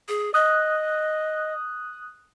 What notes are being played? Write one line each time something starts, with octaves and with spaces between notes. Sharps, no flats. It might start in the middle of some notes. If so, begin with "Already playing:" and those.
G#4
D#5 D#6 F#6